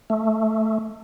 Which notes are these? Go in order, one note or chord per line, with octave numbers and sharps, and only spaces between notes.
A3